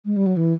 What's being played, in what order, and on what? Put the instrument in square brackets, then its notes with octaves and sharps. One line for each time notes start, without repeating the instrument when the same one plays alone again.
[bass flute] G#3
G3
F#3
E3